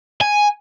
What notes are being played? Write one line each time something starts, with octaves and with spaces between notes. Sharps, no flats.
G#5